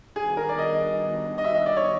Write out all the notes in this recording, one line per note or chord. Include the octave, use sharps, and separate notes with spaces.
D#3 G3 B3 D4 F#4 G#4
A#4
D5
D#5
D#5
E5
E5
D5
C#5